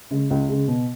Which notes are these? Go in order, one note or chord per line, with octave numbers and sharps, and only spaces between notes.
C#3 G#3
C#2
C#3 G#3
B2